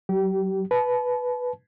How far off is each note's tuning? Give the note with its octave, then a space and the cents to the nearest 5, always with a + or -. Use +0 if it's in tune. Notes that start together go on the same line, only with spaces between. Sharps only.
F#3 +30 G4 -30
B4 +0 A5 -30